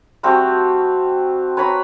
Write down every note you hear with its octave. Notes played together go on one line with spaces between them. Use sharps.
G3 A3 C4 F#4
B4 C#5 A#5 B5